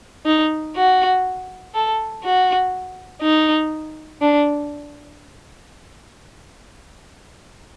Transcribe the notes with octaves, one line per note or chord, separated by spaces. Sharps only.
D#4
F#4
A4
F#4
D#4
D4